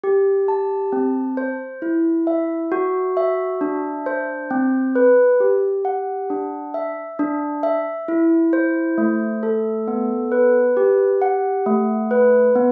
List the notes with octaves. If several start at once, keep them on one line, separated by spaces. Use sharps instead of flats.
G4
A5
C4
C5
E4
E5
F#4
E5
D4
C5
C4
B4
G4
F#5
D4
E5
D4
E5
E4
C5
A3
A4
B3
B4
G4
F#5
A3
B4
B3